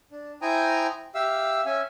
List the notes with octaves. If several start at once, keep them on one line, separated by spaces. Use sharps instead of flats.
D4
E4 C5 G5 G#5 A#5 D#6
G4 E5 F5 E6
C#4 E5 G#5